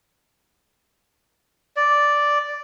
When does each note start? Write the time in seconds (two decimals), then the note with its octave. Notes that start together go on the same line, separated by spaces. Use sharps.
1.76 D5